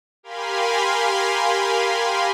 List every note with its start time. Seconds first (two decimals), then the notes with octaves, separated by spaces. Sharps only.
0.23 G4 A#4 F5 G#5 B5 C6